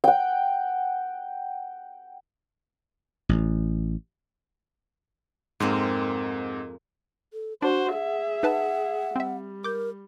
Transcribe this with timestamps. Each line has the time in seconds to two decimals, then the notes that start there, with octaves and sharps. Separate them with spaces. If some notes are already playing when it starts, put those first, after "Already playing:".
0.04 F#5 G5
3.29 A1
5.60 F2 G#2 G#3 A#3 C4
7.33 A4
7.62 D4 F#4 C5 F#5
7.93 G#4 E5
8.43 D#4 B4 F#5 A5
9.16 G3 C4 E5
9.64 A#4 D6 G6